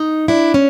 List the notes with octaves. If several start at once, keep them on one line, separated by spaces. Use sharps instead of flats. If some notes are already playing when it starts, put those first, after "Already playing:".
Already playing: D#4
D4 E4
C#4